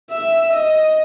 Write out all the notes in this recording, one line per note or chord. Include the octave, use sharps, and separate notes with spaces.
E5
D#5